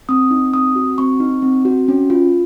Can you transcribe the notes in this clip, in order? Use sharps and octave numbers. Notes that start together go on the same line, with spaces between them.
C4 D#6
D#4
C4 D#6
F#4
C4 C#6
D#4
C4
F#4
C#4
F4